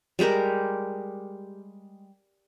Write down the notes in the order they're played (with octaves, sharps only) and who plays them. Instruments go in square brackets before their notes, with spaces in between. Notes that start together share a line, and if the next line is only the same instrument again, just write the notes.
[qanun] G3 G#3 G4 A#4